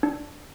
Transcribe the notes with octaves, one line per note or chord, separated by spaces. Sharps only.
D4